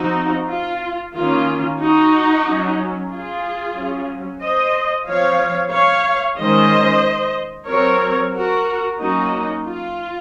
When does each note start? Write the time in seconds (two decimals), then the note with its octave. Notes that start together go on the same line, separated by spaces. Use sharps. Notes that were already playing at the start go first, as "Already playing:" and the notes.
Already playing: F3 C4 D#4 F#4
0.49 F4
1.14 D#3 A#3 C#4 F4
1.79 D#4 F#4
2.44 F#3 C#4
3.10 F4 G#4
3.75 F#3 C#4
4.40 C5 D#5
5.06 F3 C4 C#5 F5
5.71 C#5 F5
6.37 D#3 G#3 C#4 C5 D#5
7.67 F#3 C4 A#4 C#5
8.32 F#4 A#4
8.98 F#3 A#3 C#4 D#4 F#4
9.64 F4